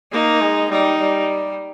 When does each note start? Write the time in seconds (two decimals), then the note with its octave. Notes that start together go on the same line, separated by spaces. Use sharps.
0.12 A#3 D#4
0.41 G#3
0.70 G3 D#4
0.99 G3